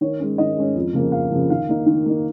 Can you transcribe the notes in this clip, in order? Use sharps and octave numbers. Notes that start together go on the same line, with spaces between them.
D#3 C#5
G#3 C#4
D#3 D#5
G#3 C#4
F2
C#3 F3 A#3
F2 F5
C#3 F3 A#3
D#3 F5
A#3 D#4
D#3
A#3 D#4